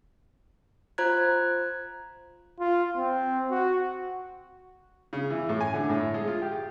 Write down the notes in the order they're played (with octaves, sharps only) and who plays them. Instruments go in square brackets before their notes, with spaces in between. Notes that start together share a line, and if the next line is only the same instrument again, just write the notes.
[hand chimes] F4 C5 A#5 F#6 G#6
[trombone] F4
C4
F#4
[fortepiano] C#3
E3
A2
G#5
D3
A2
G#3
F4
G4